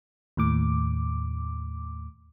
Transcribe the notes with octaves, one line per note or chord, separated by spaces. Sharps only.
D#2 A2 D6